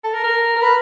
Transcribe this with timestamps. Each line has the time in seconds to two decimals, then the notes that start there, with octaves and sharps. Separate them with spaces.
0.04 A4
0.13 A#4
0.23 A#4
0.56 A#4
0.62 B4